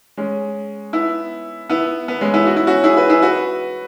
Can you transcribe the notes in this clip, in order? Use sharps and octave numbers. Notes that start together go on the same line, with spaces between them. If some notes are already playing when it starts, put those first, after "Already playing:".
G#3 C#4
B3 E4
B3 E4
B3
G#3 C#4
B3 E4
F#4
E4
C#4 F#4
E4 G#4
F#4 B4
E4 G#4
F#4 B4